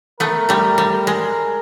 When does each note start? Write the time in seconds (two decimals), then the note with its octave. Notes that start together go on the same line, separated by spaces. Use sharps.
0.20 A3 B3 A#4
0.49 G3 A3
0.78 G3
1.07 G#3